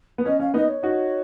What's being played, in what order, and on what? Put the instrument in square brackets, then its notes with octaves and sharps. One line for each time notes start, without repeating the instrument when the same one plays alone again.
[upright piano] B3
[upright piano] C#4 [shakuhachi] D#5
[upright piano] C#4 [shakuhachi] F5
[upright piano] B3 D#4 [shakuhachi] D#5
[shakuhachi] C#5
[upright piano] D#4 F#4